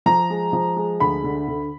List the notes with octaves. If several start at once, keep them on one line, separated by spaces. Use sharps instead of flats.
F3 A#5
G#3
F3
G#3
D2 B5
D3
D3